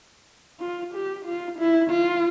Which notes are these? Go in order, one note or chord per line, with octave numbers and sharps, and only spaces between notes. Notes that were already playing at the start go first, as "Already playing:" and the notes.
F4
G4
F4
E4
F4